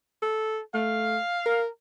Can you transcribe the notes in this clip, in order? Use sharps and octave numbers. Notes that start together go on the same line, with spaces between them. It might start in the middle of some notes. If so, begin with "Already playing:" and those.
A4
A3 F5
A#4